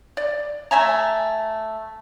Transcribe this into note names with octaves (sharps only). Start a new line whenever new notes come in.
D5
A3 E5 G#5 A#5